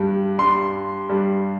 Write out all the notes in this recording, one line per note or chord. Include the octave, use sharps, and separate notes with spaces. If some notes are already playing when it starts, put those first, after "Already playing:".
Already playing: G2 G3
G2 G3 C6
G2 G3